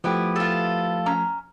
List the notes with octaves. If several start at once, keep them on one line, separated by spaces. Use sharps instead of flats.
F3 A3 B3 E4 G4
F4 A4
C#4 A#5